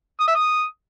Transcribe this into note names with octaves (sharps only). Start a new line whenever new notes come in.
D#6
E5
D#6